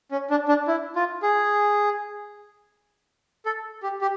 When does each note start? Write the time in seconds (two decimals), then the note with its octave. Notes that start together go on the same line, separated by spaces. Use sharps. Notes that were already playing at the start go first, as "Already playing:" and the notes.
0.11 C#4
0.30 D4
0.48 D4
0.67 E4
0.96 F4
1.22 G#4
3.46 A4
3.83 G4
4.01 G4